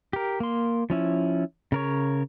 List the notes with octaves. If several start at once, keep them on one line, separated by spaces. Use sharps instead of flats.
G4 A#4
A#3 C6
F3 C#4 E4
C#3 A#4 C#5